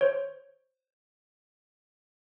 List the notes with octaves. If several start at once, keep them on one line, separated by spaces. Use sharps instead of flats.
C5 C#5